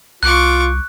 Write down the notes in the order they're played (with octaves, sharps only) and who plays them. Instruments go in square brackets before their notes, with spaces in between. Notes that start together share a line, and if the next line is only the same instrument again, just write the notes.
[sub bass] C2 [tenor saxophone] F4 [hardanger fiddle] C#6 D6 [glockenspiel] F#6